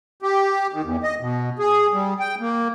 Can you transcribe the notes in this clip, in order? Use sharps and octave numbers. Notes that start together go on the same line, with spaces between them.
G4
D#3
E2
D#5
B2
G#4
G3
G5
A#3